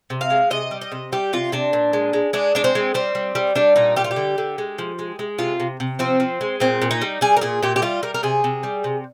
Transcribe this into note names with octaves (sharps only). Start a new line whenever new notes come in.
C3
F5
G#3
C3 D#5
G3
D#5
C3
G3 G4
C3 F4
C3 D4
A#2
G#3
G#3
G#3 D4
G#3 D4
C4
G#3
G3 C4
G3
G3
G3 D4
A#2 D#4
G3 G4
F4
G4
D3
D3
G#3
F3
G#3
G#3
C3 F4
C3
C3
F3 C4
F3
G#3
A#2 C4
A#2
D#4
G3
G3 G#4
A#4
A#2 G#4
A#2 G4
G4
G3 F4
G3 A#4
A#4
C3 G#4
C3
G3
C3